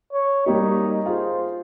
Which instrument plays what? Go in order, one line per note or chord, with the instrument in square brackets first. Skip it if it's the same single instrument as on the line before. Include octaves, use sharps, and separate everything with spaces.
[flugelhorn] C#5
[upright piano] G3 A#3 G4 [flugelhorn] D#4
[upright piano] F4 G#4 [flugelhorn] C5